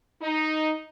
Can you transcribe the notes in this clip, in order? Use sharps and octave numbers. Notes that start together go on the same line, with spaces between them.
D#4